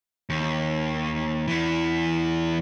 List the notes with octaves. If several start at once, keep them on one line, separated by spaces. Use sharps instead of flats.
D#2
E2 E3